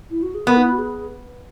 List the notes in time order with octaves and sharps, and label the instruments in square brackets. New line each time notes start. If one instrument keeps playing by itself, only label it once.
[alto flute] E4
F#4
G#4
[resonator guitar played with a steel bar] B3 [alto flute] A#4
[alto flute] D#4
E4
F#4
G#4